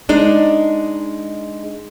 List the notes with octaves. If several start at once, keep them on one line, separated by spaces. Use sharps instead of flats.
G#3 D4 D#4